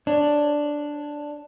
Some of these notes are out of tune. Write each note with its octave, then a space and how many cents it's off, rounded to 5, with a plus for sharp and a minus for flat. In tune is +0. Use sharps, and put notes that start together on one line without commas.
D4 +0 C#5 -10